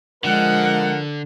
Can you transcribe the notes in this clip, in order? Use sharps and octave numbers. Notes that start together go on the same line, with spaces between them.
D3 F3 G#3 A#4 F#5